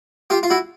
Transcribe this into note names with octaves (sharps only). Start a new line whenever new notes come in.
F4 G4
F4
E4 F#4